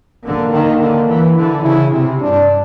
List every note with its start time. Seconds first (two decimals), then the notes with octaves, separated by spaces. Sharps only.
0.25 D3 A#3
0.53 D#3
0.80 D3
1.08 E3
1.37 D3 E4
1.65 C#3 E4
1.93 C3
2.20 G2 D4